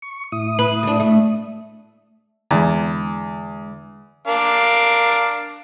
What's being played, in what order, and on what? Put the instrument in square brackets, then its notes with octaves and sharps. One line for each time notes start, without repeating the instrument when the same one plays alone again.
[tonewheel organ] C#6
A2 E4 D#6
[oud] B4
D2 D4
A3
[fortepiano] E2 [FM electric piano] D3 G#3
[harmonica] D4 A#4 F5